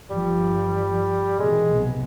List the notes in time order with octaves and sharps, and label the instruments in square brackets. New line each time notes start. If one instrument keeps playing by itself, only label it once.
[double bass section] G1 G2 F3 [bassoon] G3
[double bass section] B2 D#3 E3 [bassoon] G#3
[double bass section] B1 C3 B3